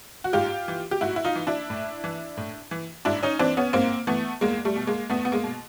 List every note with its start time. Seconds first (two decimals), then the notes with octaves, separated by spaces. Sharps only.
0.24 F#4
0.33 G#2 F4 G4
0.68 E3
0.91 G4
1.01 G#2 E4 F#4
1.16 E4
1.24 D#4 F4
1.35 E3
1.47 D4 E4
1.70 A2
2.04 E3
2.37 A2
2.71 E3
3.05 G#2 D4 E4
3.23 C#4 D#4
3.39 E3 C4 D4
3.57 B3 C#4
3.73 G#2 A#3 C4
4.07 E3 A3 B3
4.41 E2 G#3 A#3
4.65 G3 A3
4.76 B2
4.87 G#3 A#3
5.10 E2 A3 B3
5.25 B3
5.32 G#3 A#3
5.44 B2